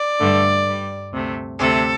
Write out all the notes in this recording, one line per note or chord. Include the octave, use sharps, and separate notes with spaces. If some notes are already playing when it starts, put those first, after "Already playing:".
Already playing: D5
G2 D3 A3
G2 G3
D2 C3 A3
D2 C3 A3 A4